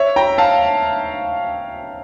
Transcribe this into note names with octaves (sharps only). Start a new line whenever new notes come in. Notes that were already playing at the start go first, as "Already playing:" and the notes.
Already playing: C#5 E5
G5 A#5
F5 A5